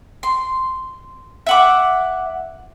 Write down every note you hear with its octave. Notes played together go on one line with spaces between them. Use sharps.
C6
E5 F#5 D6